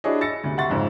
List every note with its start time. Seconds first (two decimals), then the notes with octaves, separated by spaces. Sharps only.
0.04 D4 E4 F#4 G#4 C#5 D#5
0.21 E6 A6 A#6 C#7
0.44 D2 C3
0.58 E5 F#5 C6 C#6 A6
0.70 F2 G#2 C#3 C4